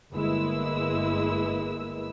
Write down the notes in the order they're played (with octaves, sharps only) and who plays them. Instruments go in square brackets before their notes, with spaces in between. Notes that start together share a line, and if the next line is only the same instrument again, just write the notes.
[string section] G1 G#3 A#3 E4 B4 E6